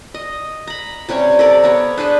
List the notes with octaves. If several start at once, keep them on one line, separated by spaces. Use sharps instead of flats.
D#5
A#5 B5
C3 G3 C#4 C#5
A4 A#4 D5
B3 C#5
D4 G#4 B4 C5